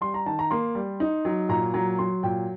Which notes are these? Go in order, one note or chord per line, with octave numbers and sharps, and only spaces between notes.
G3 C6
A#5
D#3 A5
A#5
A#3 C6
G3
D#4
F#3
A#2 A#5
F#3 A#5
F#3 C6
A#2 G5